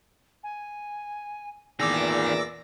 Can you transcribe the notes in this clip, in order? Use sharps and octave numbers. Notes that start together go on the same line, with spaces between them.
G#5
E2 A#2 D#3 G#4 D5 D6 E6 A#6